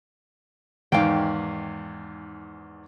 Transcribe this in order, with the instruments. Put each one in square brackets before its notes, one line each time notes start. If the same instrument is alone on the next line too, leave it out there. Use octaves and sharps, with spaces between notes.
[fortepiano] E2 G#2 D#3 [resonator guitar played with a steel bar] F5 G5